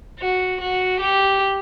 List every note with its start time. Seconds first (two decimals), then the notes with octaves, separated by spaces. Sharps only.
0.19 F#4
0.61 F#4
1.00 G4